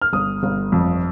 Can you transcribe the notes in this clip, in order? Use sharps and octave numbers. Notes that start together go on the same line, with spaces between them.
F6
G1 D#6
G1
F2